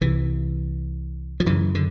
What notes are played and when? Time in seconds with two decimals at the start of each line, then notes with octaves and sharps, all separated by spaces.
0.01 C2 C3 E3
1.40 F3
1.46 F#2 C#3 E3
1.75 D3